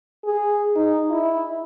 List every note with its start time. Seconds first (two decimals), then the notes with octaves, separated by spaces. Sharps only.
0.25 G#4
0.75 D#4
1.10 E4